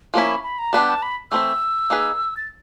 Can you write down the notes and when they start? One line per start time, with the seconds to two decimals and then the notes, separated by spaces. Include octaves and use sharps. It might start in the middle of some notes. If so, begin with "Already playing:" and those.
0.14 F3 A#3 C#4 E4 A#5
0.28 B5
0.43 B5
0.59 A#5
0.73 G3 B3 D4 G4 A5
0.87 A5
1.02 B5
1.31 E3 A3 C4 E4 E6
1.90 A#3 D#4 G#4 B4
2.37 A6